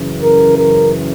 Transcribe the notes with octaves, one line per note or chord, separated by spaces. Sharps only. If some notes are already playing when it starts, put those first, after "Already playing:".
Already playing: F#2 C#3 E3
A#4
A#4